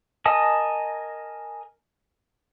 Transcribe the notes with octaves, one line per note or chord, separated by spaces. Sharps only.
A#4 D#5 G#5 A5 D#6